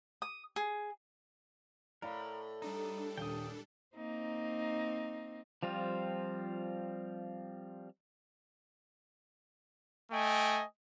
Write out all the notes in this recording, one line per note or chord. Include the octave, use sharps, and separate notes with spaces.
D#6
G#4
A2 A#4 D5 F5 B5
G3 D4 D#4 A4
D#1 G5 D#6
A#3 C4 D#4
F3 G3 C4 F4
A3 D#5 G5 G#5